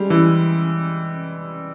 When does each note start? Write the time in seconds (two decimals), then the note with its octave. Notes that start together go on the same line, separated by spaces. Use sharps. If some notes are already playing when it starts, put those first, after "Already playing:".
Already playing: G3 G#3
0.10 E3